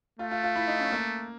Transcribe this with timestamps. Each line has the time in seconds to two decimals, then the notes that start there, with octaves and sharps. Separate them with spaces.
0.19 A3 F4
0.31 F4
0.44 F4
0.56 E4
0.68 D#4
0.80 C#4
0.92 A#3